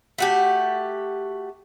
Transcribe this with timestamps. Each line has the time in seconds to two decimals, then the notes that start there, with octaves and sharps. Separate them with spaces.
0.18 A3 F#4 G4